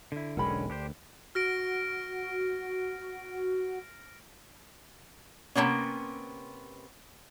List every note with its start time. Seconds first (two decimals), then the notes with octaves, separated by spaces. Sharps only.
0.12 D3 E4
0.37 E1 B1 D3 G#3 C#4 A#4 G5 B5
0.70 D2 D4 G4 C5
1.35 F#4 F6 A#6 D7
5.55 C3 F3 A#3 B3 C#4